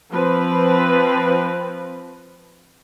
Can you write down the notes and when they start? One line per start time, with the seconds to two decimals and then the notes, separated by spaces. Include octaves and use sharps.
0.11 F3 C4 B4